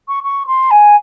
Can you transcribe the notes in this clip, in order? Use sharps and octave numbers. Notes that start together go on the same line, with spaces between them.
C#6
C#6
C6
G#5